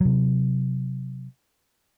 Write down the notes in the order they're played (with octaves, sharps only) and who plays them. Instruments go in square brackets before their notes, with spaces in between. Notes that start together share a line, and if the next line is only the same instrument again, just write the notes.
[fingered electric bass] C3 F#3